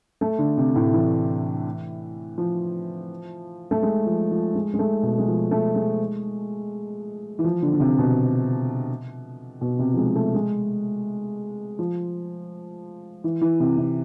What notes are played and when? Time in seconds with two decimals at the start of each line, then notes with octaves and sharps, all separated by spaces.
0.21 A3
0.39 D3
0.57 C3
0.76 A2
0.93 E3
2.38 F3
3.71 A3
3.82 G#3
4.07 F3
4.31 F3
4.55 G#3
4.74 G#3
4.79 A3
5.03 B2
5.18 G#3
5.27 F3
5.51 A3
5.75 G#3
7.39 E3
7.44 F3
7.62 D3
7.73 D3
7.80 C3
7.98 B2
9.61 B2
9.79 C3
9.94 F3
9.97 G#3
10.15 A3
10.35 G#3
11.79 F3
13.24 E3
13.41 E3
13.60 C3
13.77 C3